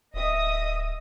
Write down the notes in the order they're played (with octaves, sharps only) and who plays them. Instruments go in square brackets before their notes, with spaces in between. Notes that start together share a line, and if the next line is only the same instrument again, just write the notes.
[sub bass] D1 [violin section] D#5 E5 D#6